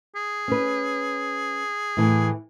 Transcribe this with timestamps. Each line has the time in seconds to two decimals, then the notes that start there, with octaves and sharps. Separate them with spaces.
0.16 G#4
0.48 C#4 B4
1.97 A2 E3